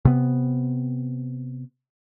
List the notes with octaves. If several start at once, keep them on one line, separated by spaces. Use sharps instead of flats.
C3 B3